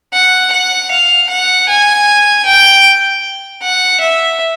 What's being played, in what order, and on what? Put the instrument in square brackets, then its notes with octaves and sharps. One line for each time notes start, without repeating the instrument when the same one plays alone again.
[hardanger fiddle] F#5
F#5
F5
F#5
G#5
G5
F#5
E5